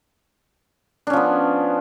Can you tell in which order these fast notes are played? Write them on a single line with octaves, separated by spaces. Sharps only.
D4 C#4 F3 B3